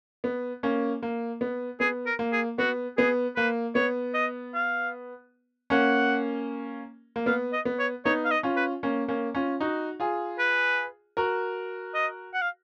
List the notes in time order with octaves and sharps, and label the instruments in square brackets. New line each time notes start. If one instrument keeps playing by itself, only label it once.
[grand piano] B3
A#3 C#4
A#3
B3
[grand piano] B3 [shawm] G#4
[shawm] A#4
[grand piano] A#3
[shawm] G#4
[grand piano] B3 [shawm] F#4
[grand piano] B3 [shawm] G#4
[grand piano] A#3 [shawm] B4
[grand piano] B3 [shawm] C#5
[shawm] D#5
F5
[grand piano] A#3 C#4 [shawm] F#5
[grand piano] A#3
[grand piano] B3 [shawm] F5
[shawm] D#5
[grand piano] B3
[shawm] C#5
[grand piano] B3 D#4 [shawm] C#5
[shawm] F5
D#5
[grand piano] C#4 F4
[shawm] B4
[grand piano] A#3 C#4
A#3 C#4
C#4 F4
D#4 F#4
F4 G#4
[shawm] B4
[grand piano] F#4 A#4
[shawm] D#5
F#5
F5